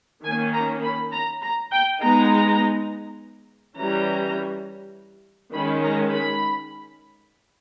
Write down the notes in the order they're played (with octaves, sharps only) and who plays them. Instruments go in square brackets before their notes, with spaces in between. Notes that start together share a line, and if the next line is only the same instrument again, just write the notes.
[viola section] D#3 A#3 C#4 G#5
A#5
B5
A#5
A#5
G5
G#3 B3 D#4 A#5
E3 G3 C#4 A#5
D#3 G#3 C#4 B5
A#5
B5